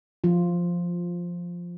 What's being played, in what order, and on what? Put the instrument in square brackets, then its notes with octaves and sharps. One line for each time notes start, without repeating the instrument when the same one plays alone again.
[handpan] F3 F4